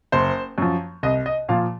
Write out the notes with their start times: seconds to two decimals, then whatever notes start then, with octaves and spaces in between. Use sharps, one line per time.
0.12 F#1 C5
0.58 F#2 F3
1.03 C2 D#5
1.26 D#5
1.49 A#2 F3 F5